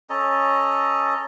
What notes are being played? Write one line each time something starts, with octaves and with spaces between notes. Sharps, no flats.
C#4 A4 D#5 A#5